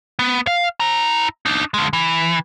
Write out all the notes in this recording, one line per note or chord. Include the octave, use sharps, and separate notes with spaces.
B3
F5
E4 A#5
D4 D#4
D3 G#3
E3